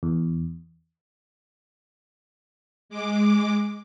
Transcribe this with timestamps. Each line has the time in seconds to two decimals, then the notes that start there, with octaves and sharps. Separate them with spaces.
0.03 E2
2.89 G#3 D6